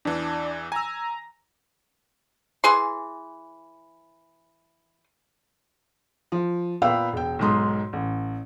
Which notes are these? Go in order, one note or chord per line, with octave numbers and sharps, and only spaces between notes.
E2 E3 D4
G#5 A#5 E6
E3 G#4 C6
F3
A#2 B3 F5 G5 B5 E6
E1 G5
B1 G#2 G#3 C6 D#6
A1